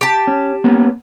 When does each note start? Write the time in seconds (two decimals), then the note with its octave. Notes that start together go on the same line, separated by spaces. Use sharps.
0.01 G4 A5
0.27 C#4
0.64 A#3 B3 C#4